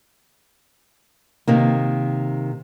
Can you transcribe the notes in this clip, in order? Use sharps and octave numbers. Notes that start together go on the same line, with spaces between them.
C3 D#3 A#3